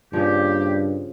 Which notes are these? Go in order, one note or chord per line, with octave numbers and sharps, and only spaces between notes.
G2 C#3 F3 G3 A#3 G4